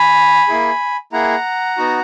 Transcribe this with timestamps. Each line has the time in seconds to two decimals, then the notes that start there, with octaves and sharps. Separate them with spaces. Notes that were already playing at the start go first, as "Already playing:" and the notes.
Already playing: G#5 B5
0.48 A#3 E4 G#4
1.12 A#3 E4 G#4 F#5 A#5
1.77 B3 D#4 F#4